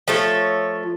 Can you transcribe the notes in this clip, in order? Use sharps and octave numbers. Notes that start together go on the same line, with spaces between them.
F3 A3 A4 C#5